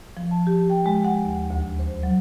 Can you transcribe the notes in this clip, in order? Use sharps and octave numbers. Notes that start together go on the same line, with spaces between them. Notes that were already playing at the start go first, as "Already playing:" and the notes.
F3
A5
G4
G5
G#3
F#5
D#2
D2
C5
F#3